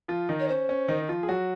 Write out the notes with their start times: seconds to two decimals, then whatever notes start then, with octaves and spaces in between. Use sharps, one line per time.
0.08 F3 F4
0.29 D#3 D#4
0.40 C#5
0.48 C#4 C5
0.69 C#4
0.88 D#3 D#4
1.02 D#4
1.09 F3 F4
1.23 G#4
1.28 F#3 F#4